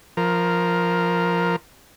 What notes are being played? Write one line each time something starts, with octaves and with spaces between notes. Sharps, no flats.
F3 A#4